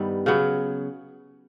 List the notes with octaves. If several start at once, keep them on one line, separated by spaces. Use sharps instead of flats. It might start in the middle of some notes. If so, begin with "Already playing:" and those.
Already playing: G2 D#3 G3 B3
C#3 F#3 B3